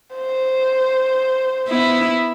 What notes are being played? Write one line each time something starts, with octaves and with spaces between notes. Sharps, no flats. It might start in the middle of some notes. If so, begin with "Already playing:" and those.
C5
B3 E4